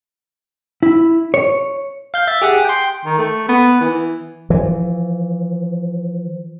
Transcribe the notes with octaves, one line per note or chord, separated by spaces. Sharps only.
E4
C#5
F5 G6
E5 A6
G4 G#4 F#5
G5 C6
D#3
A3
B3
E3
E3 F3